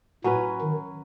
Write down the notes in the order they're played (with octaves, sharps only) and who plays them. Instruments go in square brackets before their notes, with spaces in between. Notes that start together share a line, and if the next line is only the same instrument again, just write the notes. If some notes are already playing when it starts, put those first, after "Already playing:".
[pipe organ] A2 [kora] F#3 C#4 F#4 B4
[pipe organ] D#3